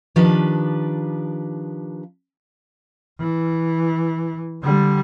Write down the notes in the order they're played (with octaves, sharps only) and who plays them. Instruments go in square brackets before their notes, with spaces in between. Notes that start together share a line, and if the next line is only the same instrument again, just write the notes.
[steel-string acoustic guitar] D#3 F3 D4 G4 B4
[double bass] E3
D3 G3